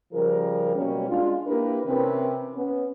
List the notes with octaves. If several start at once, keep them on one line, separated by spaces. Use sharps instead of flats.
C#3 F3 G3 G#4 A#4
B2 F#3 G3 A#3 C#4
G#3 D4 F4
A#3 D4 E4 G4 A#4 B4
C3 E3 C4 C#4 A#4 B4
B3 C#4